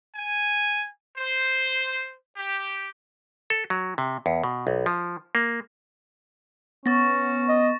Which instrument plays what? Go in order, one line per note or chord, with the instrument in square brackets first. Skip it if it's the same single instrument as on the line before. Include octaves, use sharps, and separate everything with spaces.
[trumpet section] G#5
C5
G4
[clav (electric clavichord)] A4
F#3
C3
E2
B2
B1
F3
A#3
[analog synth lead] B3 [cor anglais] C#4 [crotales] C#6 A6 A#6
[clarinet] D#5